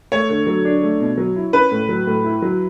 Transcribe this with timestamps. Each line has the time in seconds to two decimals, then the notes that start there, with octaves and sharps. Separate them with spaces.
0.12 A3 C#5
0.30 D3
0.47 F#3
0.65 D4
0.83 A3
1.00 B2
1.18 F#3
1.36 E4
1.53 C#4 B4
1.72 A2
1.89 F#3
2.07 A2
2.24 E4
2.42 F#3